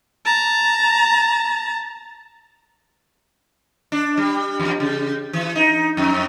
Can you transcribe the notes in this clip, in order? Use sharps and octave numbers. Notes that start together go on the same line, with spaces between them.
A5 A#5
D4
G3
E2
C#3
E3
D#4
F2